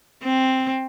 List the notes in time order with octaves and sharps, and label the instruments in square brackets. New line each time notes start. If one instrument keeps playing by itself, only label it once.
[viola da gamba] C4